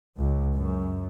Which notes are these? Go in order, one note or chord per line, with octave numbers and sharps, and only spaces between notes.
C#2
F#2